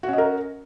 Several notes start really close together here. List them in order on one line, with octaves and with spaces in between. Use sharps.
F#4 C#4 D#5 A#4